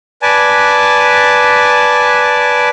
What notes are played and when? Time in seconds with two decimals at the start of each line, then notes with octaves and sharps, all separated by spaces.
0.22 B4 D5 G#5 A5